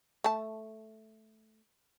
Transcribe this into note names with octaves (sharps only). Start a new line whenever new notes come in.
A3 A5